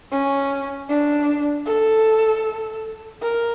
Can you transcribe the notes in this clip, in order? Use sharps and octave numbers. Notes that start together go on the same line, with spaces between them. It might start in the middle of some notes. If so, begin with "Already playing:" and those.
C#4
D4
A4
A#4